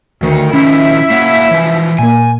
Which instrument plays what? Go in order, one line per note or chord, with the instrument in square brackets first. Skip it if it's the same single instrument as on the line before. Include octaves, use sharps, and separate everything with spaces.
[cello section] D2 [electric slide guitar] D#3
[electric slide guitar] D#3 F3 [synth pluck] C#4 [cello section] E4 E5
[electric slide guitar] A#3 C#5 F#5 [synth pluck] B6
[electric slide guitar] E3 F3
[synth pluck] A#2 A#3 [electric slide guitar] G#5